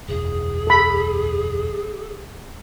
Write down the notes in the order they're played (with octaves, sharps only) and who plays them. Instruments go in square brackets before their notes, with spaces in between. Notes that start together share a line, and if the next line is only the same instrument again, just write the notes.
[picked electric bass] F#1 B1 E2 [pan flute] G#4
[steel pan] A4 B5